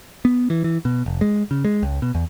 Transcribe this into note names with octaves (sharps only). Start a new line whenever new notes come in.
B3
E3
E3
B2
F1
G#3
C#3
G#3
C#2
B2
E2